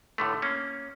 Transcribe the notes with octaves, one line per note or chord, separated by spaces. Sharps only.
A2 D3 A3
A#3 C#4